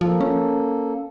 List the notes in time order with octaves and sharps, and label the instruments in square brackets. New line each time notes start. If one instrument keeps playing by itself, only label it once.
[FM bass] F3 [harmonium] A#3 A4
[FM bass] C#4